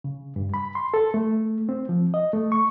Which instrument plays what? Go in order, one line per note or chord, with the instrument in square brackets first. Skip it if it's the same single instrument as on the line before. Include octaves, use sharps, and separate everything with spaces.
[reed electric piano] C#3
G2
B5
C6
A4
A3
C4
F3
D#5
A3
C#6